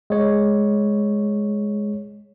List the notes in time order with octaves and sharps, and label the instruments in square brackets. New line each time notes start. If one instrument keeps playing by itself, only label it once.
[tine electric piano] G#3 C#5